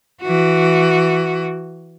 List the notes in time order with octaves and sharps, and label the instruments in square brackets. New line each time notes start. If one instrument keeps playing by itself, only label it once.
[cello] E3 F#4